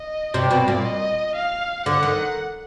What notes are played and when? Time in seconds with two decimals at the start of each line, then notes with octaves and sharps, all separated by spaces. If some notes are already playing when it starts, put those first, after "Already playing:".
Already playing: D#5
0.34 C3 D5
0.51 B2
0.68 A#2
0.85 D#5
1.36 F5
1.86 D3 F#5
2.03 D#3